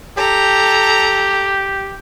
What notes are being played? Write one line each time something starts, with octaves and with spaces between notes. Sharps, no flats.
G4 A4 A#5